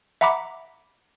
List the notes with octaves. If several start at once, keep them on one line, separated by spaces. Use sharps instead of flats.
E5 F#5 A#5 B5 D6